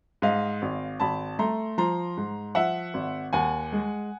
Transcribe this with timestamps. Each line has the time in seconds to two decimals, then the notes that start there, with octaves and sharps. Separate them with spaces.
0.22 G#2 D#5 F5
0.62 G#1
1.00 G#1 A5 B5
1.39 A3 A#5 C6
1.78 F3 A#5 C6
2.17 G#2
2.55 F3 E5 F#5
2.94 G#1
3.33 D#2 F#5 G#5
3.72 G#3